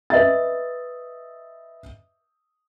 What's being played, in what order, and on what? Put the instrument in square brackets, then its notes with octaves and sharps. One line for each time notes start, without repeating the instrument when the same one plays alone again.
[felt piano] B4 D#5 E5 A6